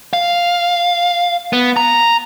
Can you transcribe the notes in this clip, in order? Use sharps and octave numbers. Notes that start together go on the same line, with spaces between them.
F5
B3
A#5